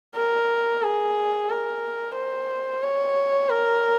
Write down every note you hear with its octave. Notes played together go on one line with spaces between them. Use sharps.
A#4
G#4
A#4
C5
C#5
A#4